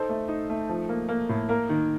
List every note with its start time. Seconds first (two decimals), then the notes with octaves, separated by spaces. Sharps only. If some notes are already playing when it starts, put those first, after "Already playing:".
Already playing: D#4 A4 C5
0.09 A3
0.28 D#4
0.49 A3
0.69 F3
0.89 A#3
1.09 A#3
1.29 A2
1.49 A#3 A#4
1.69 D#3